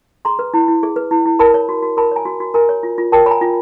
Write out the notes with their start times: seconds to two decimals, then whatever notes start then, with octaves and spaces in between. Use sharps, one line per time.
0.25 G#4 A#5 C6
0.39 B4
0.54 E4
0.68 E4
0.83 G#4
0.96 B4
1.11 E4
1.26 E4
1.39 A#4 A5 B5
1.54 C#5
1.69 F#4
1.82 F#4
1.97 A#4 A5 B5
2.12 C#5 G#5 A#5
2.25 F#4
2.40 F#4
2.54 A#4 G#5 A#5
2.69 C#5
2.83 F4
2.98 F4
3.12 A#4 G5 A5
3.26 C#5 B5
3.31 G#5 A#5
3.41 F4